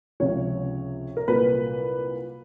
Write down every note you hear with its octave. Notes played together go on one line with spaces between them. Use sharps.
C#2 C3 F3 C#5
A#4
C2 A#2 F#3 A#3 B4